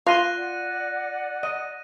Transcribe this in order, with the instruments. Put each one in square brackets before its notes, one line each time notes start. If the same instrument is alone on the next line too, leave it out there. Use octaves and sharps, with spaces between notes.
[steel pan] F4 C6 [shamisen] F5 [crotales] F#6 A#6 D#7
[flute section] D5 F#5
[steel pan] D#5 [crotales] D#7